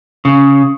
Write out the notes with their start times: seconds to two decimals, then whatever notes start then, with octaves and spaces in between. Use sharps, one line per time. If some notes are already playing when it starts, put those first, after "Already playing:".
0.25 C#3